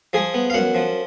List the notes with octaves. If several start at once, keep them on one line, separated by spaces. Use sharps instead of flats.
F3 G#4
B3
F5
F#2 F#5
F3